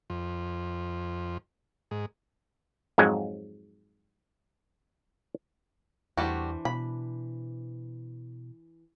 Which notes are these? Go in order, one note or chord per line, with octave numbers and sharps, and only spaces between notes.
F2
G#2
F2 G#2 F#3 G#3
E2 E3 G3 A3 D4 F#4 C5
B2 B5